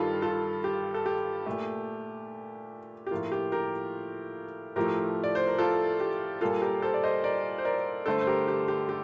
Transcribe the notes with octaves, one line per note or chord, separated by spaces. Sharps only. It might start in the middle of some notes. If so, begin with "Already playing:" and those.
Already playing: G2 D#3 G3 F4 A4
F4 A4
G4
A4
G4
A#2 A3
G4
A2 F3 A#3 F4
G4
G4 A#4
A2 F3 A3 G4 A#4
D5
C5
A#4
F4 A4
G4
A#2 G3 A#3 F4 A4
G4 A#4
A4 C5
D5
C5 D#5
A#4 D5
C5
A#4 D5
G2 D3 A3 A4 C5
C5
G4 A#4
G4
G4
G4